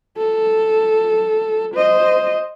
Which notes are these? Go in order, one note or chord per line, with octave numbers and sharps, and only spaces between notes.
A4
C5 D#5